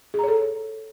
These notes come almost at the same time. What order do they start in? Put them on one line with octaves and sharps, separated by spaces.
G#4 A#5 C#5 A4